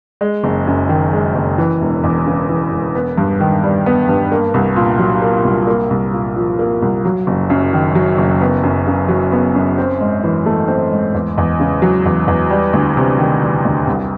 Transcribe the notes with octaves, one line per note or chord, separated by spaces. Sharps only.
G#3
F#1
F#2
D#3
G#3
F#1
E3
E1
E2
C#3
E3
E1
B3
G2
D#3
G3
B3
G2
A#3
C2
A#2
F#3
A#3
C2
A#3
C2
A#2
F3
A#3
C2
F#3
F#1
F#2
D#3
F#3
F#1
B3
F#2
C#3
F#3
B3
F#2
C4
G#2
E3
A3
C4
G#2
E2
E2
C#3
F#3
E2
E2
G3
D2
C3
D#3
G3
D2
C2